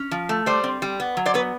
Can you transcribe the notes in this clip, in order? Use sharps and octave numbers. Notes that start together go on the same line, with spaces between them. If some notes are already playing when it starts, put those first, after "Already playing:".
Already playing: C#4
F3
A3
G3 C5 D5
C4
G3
B3
F#3
C5 D5
B3 B4 C#5